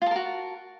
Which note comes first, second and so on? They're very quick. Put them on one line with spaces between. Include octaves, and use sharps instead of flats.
F4 A5 A#4 F#4